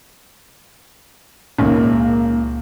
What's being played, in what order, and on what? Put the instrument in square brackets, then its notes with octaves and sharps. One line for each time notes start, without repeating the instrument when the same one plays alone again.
[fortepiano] G#1 [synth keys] C#2 A#2 [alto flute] A#3 [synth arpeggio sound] C#4